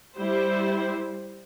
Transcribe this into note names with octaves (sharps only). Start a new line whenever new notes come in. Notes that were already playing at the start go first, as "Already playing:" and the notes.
G3 E4 C5